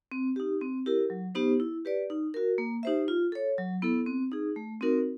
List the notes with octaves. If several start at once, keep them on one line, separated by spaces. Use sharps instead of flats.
C4
D#4 G4
C4
E4 G4 A#4
F#3
B3 D#4 G4 C5
E4
G4 B4 D5
D#4
F#4 A#4
A#3
D#4 G4 C5 E5
F4
A4 C#5
F#3
B3 E4 A4
C4
D#4 G#4
A3
C4 D#4 F#4 A#4